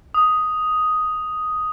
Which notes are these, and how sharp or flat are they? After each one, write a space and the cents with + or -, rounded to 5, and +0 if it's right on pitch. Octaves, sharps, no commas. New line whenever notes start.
D#6 +5